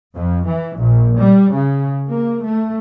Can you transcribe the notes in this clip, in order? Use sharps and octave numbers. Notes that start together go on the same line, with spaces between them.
F2
E3
A#1
G3
C#3
A#3
A3